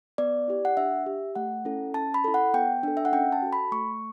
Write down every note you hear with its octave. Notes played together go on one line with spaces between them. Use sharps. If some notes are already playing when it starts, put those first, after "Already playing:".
B3 D5
E4 G4
F#5
D4 E5
G4
A3 F#5
C#4 E4 A4
C#4 A5
B5
E4 A4
F#5
B3 G5
D4 A4
E5
F#5
C#4 G5
A5
F#4 A4
B5
A3 C#6